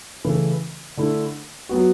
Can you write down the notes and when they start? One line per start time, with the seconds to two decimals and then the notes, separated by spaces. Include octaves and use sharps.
0.24 C#3 E3 A3 E4
0.97 D3 A3 E4
1.69 F#3 B3 F#4